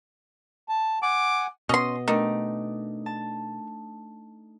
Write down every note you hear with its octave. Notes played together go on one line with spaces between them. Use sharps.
A5
F#5 G#5 D6
B2 B3 C#4 D#5 C6 D#6
D#3 A3 D4 D#4
A5